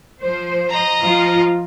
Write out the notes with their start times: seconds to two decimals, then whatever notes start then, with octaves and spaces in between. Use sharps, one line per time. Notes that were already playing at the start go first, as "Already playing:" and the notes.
0.20 F3 C5
0.70 D#5 A#5
1.01 F3 F4